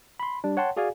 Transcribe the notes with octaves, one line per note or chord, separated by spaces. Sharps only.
B5 C6
G3 D4
C#5 F#5 G5 A5 C6
F#4 G#4 D5 F5 G#5